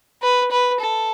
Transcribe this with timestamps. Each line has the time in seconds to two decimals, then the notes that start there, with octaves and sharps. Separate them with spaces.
0.22 B4
0.51 B4
0.80 A4